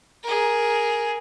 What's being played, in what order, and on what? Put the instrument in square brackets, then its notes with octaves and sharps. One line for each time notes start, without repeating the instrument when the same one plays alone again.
[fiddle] G#4 A#4